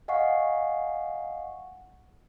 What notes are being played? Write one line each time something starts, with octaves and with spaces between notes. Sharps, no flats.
D#5 F5 F#5 G#5 C#6 C7